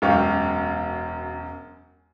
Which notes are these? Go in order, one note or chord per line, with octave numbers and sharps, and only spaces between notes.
E1 F#2 G4 F5 C#6